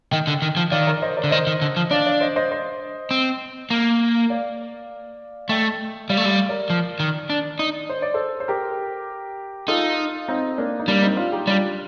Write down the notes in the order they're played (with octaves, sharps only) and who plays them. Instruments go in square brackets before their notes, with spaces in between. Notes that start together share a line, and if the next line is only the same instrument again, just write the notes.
[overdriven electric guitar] D#3 [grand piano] D#5 G5
[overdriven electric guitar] D3
D#3
F3
[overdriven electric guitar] D#3 [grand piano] D5 F5
[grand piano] A#4 D5
C5 D#5
A#4 D5
[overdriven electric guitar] D3
[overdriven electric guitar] D#3 [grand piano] C5 D#5
[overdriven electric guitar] D#3
D3
F3
[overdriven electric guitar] D4 [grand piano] D5 F5
[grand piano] D5 F5
C5 D#5
C5 D#5
C5 D#5
[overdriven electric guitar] C4
A#3
[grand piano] D5 F5
[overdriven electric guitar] A3 [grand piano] D#5 G5
[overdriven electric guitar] G3 [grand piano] D5 F5
[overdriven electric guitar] A3
[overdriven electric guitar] G3 [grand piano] D5 F5
[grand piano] A#4 D5
[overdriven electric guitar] F3
D#3
D4
D#4
[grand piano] C5
D5
A4 C5
C5
G4 A#4
[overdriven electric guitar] D#4 [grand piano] F4 A4
[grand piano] C4 D#4
A#3 D4
D#4
[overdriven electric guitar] G3 [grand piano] A#3 D4
[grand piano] C4 D#4
D4 F4
D#4 G4
[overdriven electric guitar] G3 [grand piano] D4 F4